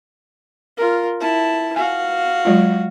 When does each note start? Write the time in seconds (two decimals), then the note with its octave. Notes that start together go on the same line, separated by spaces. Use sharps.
0.77 F4 A#4
1.20 E4 A5
1.76 F#4 F5 G#5
2.45 F#3 G#3 F4